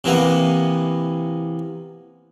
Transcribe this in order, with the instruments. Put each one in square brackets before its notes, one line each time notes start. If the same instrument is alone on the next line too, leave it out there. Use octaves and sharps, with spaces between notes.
[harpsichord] C3 E3 A#3 B3